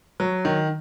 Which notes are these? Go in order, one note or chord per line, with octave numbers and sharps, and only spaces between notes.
F#3
D#3